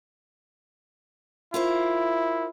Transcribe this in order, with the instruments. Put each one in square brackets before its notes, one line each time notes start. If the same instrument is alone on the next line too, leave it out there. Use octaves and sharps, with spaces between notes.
[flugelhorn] E4 [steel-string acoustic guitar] F4 A#4 C5